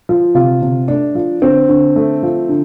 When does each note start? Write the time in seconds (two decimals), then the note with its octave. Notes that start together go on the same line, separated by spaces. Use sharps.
0.09 F3
0.35 C3 F4
0.62 C3
0.88 A3 D4
1.15 F3
1.42 D3 C4
1.69 D3
1.96 A3
2.23 F3
2.49 D3